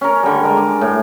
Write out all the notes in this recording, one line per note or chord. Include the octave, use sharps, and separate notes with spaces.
C#4 A#4
D3 G3
G#3 A#4
D6
A2